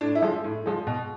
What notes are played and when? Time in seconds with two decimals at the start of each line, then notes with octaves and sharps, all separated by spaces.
0.01 A2 D4
0.15 E4
0.22 F3 G#3
0.44 A2
0.66 F3 G#3
0.87 B2